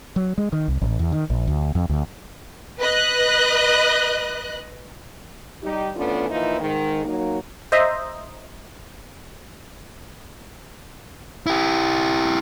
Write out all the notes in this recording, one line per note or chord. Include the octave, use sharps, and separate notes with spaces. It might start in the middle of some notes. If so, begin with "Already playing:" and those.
F#3
G#3
D#3
C2
A1
E2
D#3
A#1
D2
F2
D2
B4 D#5 F#6
G3 D#4 G4
E3 A3 B3 C#4 D4 F4
E3 F3 A#3 D#4 E4 C5
G#2 D#3
F#3 A#3 D#4
C5 D#5 E5 A#5
E4 G4